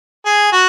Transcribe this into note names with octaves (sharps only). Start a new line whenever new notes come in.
G#4
F#4